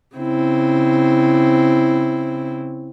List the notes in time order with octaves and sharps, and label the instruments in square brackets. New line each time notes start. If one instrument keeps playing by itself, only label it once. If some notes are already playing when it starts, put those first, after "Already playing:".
[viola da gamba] C#3 C4 E4